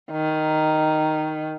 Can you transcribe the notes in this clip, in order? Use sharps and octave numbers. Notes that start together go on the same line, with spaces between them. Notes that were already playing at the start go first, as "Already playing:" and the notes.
D#3